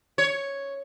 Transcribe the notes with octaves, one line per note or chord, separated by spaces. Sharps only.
C#5